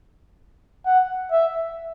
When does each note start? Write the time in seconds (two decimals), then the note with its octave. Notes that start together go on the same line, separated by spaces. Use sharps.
0.86 F#5
1.32 E5